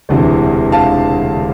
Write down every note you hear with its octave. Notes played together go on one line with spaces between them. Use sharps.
E1 D2 C3 E3
F5 A5